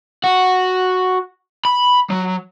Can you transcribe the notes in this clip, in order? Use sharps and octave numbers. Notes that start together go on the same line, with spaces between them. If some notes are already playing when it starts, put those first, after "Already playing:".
F#4
B5
F#3